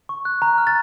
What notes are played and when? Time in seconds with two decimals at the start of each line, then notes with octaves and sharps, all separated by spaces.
0.09 C#6
0.25 F#6
0.42 A#5
0.58 F6
0.67 A6